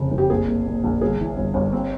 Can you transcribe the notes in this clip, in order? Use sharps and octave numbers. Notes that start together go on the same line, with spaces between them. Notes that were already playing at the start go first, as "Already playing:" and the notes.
Already playing: F1 C#3 F3
F1
G4
A#1 G#4
A#2
A#2
A#1
G1 G#4
E3
G1
G1
C4